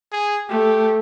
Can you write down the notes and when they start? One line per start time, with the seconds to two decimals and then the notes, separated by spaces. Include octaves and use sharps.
0.12 G#4
0.49 A3 G4